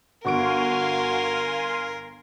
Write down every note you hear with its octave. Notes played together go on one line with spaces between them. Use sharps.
G1 F#4 A#4 F5 G#5 C6 C#6 D7